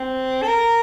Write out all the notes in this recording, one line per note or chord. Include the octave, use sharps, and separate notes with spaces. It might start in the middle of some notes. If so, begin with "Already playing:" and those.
Already playing: C4
A4
A#4